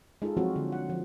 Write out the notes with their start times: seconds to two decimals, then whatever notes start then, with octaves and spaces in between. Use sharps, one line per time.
0.22 G#3 D#4 F4 A4
0.37 F3 F#3 G#3 C4 F4 F#4
0.56 D3
0.72 F#5
0.90 F3